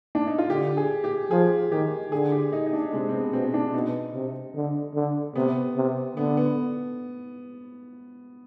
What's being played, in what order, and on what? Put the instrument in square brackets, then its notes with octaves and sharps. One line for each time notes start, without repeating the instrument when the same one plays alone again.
[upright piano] D4
D#4
F4
[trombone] D3 [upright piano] G4
[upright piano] G#4
G4
[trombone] F3 [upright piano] G#4
[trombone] D#3 [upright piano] G4
[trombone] D3 [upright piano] G#4
[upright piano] G4
D#4
D#4
D4
[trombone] C3 [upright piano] G#3
[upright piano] C4
B3
[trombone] B2 [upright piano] C4
[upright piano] D4
[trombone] B2 [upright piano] D#4
[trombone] C3
D3
D3
[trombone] C3 [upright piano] B3
[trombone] C3
[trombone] D3 [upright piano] B3
[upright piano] B3